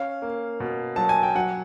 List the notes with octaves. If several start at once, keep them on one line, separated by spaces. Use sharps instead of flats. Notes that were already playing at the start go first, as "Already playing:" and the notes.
Already playing: C#4 F5
A#3
B2
F#3 A5
G#5
G5
F#3 F#5